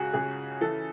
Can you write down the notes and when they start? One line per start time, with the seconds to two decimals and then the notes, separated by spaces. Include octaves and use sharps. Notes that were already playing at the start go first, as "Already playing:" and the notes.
Already playing: C#2 C#3 F#4 G#4
0.13 C#3 G#4
0.61 E3 A4